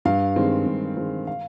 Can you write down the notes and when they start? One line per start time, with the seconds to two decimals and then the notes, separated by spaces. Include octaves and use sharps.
0.05 G2 F5
0.36 D#3 G#3 C4
0.66 G2
0.97 D#3 G#3 C4
1.27 F5